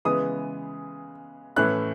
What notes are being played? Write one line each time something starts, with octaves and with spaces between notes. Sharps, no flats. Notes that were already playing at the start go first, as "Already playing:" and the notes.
C#3 E3 G#3 B3 D#6
A2 E3 A3 C#4 E4 F#6